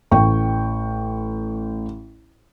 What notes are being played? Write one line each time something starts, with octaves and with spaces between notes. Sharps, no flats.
A1 G5 C#6